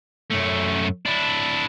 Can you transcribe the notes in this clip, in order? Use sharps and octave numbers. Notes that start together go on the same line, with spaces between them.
F#2 A3
D4 E4